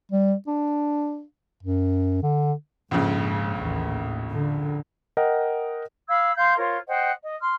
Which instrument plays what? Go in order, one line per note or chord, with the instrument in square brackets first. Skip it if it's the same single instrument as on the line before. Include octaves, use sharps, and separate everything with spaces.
[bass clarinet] G3
D4
F#2
D3
[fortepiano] A#1 F2 C#3 [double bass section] G#2
[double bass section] A1 D#2
D3
[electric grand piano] A#4 D#5 F#5 G5
[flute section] F5 B5 E6 G#6
F5 C6 G6 G#6
F4 A#4 C5 C#5
C5 D#5 F#5 G5
D#5
C6 F6